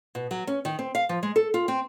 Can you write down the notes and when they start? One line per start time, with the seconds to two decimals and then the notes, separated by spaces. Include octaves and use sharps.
0.15 B2
0.31 F#3
0.47 C#4
0.65 D#3
0.79 C4
0.95 F5
1.09 F3
1.23 G#3
1.36 A4
1.54 F4
1.68 C4